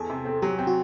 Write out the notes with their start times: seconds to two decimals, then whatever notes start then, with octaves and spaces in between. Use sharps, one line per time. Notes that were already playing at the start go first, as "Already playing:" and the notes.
Already playing: E2 A4
0.10 C3
0.25 C4
0.42 F#3 G4
0.59 C4
0.67 F#4